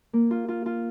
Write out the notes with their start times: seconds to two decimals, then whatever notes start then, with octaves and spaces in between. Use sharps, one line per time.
0.13 A#3
0.31 F4
0.48 F4
0.66 F4